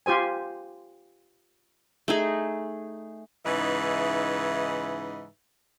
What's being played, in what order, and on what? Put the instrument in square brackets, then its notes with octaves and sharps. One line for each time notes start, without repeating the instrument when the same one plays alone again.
[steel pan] F4 G4 C5 G#5
[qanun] A3 D#4 G#4
[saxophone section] G#2 C#3 E3 D#4 B4 E5